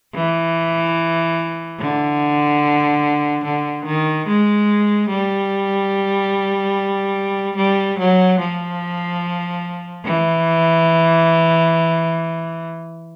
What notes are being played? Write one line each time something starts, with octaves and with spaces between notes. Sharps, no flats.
E3
D3
D3
D#3
G#3
G3
G3
F#3
F3
E3